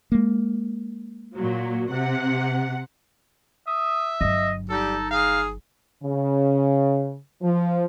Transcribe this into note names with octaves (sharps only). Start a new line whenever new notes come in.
G#3 A#3
A#2 F#3
C3 F#5
E5 D#6
G1 F#3 D#5
G3 D#4 A4
G#4 F5
C#3
F3